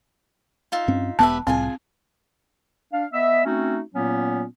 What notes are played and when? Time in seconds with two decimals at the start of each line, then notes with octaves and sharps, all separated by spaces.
0.72 D#4 F4 E5
0.88 G2 C4 C#4
1.19 E1 E2 B3 G4 B4 E5 A5
1.47 C2 A2 C4 F4 G#4 G#5
2.93 D4 F5
3.13 B3 D#5 E5
3.46 A3 C4 C#4 D#4 F#4
3.94 A#2 F#3 A#3 B3 C#4